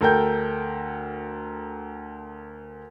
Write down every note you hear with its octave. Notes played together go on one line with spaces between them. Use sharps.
D2 A4 A#4 G5 G6